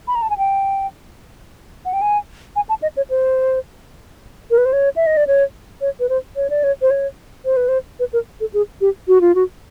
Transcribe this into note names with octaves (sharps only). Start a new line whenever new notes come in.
B5
A#5
A5
G#5
G5
F#5
G5
G#5
G#5
A5
D#5
C#5
C5
A#4
B4
C5
C#5
E5
D#5
D5
C#5
C#5
B4
C5
C#5
D5
C#5
C5
C#5
C5
B4
C5
B4
A#4
A4
G#4
G4
F#4
F4
F#4